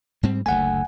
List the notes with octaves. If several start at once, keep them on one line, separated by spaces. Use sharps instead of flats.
G#2 G3 C4
F#1 D2 A3 F#5 G#5